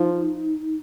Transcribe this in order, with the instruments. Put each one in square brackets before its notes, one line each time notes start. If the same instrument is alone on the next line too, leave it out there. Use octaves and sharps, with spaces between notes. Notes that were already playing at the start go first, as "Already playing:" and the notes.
Already playing: [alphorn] F3 [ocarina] D#4